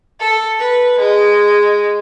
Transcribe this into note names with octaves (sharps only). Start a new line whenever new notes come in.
A4
B4
G#3